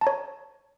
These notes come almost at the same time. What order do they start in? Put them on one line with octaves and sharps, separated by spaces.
A5 A#5 C#5